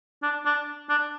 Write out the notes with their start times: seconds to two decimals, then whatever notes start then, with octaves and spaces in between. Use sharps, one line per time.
0.23 D4
0.46 D4
0.89 D4